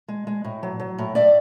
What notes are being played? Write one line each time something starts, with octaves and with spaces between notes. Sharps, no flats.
G#3
G#3
A2
F#3
F#3
A2
A2 D5 E5